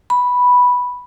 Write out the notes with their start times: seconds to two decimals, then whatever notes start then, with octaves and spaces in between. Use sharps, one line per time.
0.10 B5